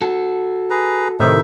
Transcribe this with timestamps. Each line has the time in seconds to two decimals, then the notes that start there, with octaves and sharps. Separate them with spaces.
0.02 F#4 A4
0.70 G#4 B4 A#5
1.20 A2 C3 D#3 D#4 E5